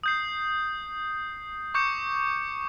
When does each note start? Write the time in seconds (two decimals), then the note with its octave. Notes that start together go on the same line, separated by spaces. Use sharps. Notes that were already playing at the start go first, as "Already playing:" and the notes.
0.03 D#6 G6 C7
1.74 C#6 D6 G6 C#7